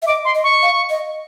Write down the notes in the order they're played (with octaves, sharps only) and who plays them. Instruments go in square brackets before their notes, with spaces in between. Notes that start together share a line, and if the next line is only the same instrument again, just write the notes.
[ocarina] E5
[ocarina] D#5 [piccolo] D6
[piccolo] C6
[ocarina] D#5
[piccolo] C#6
[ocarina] F5
D#5